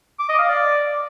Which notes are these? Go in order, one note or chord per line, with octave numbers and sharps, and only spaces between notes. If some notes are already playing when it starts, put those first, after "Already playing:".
D6
D#5
F5
D5